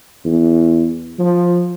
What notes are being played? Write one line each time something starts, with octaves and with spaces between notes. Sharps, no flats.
E2
F3